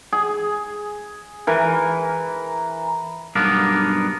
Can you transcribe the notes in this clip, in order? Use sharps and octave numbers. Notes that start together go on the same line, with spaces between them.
G#4
E3 A#4
B1 G2 A#3 B3 D4 A#4